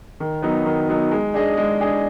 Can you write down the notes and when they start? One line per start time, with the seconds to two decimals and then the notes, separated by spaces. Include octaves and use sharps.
0.20 D#3
0.43 F#3 B3 D#4
0.66 D#3
0.89 F#3 B3 D#4
1.11 G#3
1.34 D4 G#4 D#5
1.57 G#3
1.81 D4 G#4 D#5